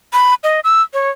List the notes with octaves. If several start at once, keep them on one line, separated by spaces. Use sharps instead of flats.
B5
D#5
E6
C#5